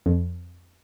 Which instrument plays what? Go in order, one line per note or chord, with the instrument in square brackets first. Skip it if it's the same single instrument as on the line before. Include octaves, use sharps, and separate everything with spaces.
[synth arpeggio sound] F2